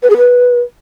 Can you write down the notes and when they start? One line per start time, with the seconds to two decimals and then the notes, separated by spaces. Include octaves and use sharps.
0.03 B4
0.10 G#4
0.17 B4